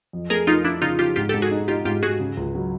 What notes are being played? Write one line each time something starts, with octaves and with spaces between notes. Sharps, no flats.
F2
A3 G#4 A#4
F2 D#4 F4
F3 D4 E4
C#3 D#4 F4
F3 F4 G4
G#2 F4 G4
G4 A4
G#2
F#4 G#4
D#4
D#4 F4 G4
G#2 F4 G4
G#2 F#4 G#4
C#3
C#2
F#3